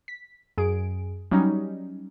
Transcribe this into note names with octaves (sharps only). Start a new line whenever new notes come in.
B6
F#2 G#4 D7
F#3 G3 C#4 D#4